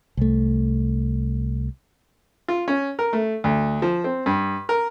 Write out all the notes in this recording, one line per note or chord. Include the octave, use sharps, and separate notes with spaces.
C2 A3
F4
C#4
A#4
A3
D2
F3
C4
G2
A#4